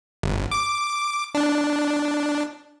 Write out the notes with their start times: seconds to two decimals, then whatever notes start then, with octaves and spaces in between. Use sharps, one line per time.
0.23 G1
0.51 D6
1.35 D4